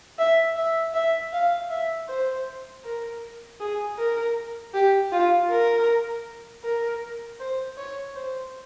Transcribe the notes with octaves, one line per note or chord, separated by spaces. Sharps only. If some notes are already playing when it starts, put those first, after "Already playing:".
E5
E5
E5
F5
E5
C5
A#4
G#4
A#4
G4
F4
A#4
A#4
C5
C#5
C5